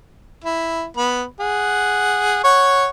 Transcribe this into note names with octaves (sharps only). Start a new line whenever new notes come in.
E4
B3 B5
G#4 F#5
C#5 F#5 C#6